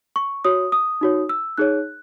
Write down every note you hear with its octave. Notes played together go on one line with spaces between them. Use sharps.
C#6
F#4 C#5 D#6
D#6
D#4 F#4 C#5
E6
D#4 G#4 C#5 F#6